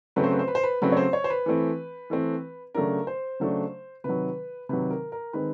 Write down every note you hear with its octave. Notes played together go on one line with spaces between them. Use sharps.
C#3 F#3 A3 C4 B4
C5
B4
C5
B4
C5
B4
C#3 F#3 A3 C4 B4
C#5
C5
C#5
C5
B4
E3 A3 C4
E3 A3 C4
C#3 F#3 A3 D4 A#4
C5
C#3 F#3 A3 D4
C3 D#3 F#3 B4
C3 D#3 F#3 B4
A#4
A#4
D#3 G#3 C4 B4